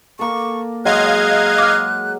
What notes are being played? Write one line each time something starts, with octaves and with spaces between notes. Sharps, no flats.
A#3 A4 C#6
F#3 G#3 D#5 F5 F#6 G#6
D6 F6